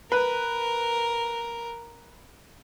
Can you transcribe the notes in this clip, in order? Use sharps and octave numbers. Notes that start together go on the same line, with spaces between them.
A#4 B4